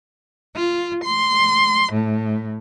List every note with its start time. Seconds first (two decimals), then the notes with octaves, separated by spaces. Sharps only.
0.54 F4
1.03 C6
1.92 A2